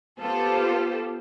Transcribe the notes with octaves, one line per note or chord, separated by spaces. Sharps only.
B3 F4 G4 A4 C5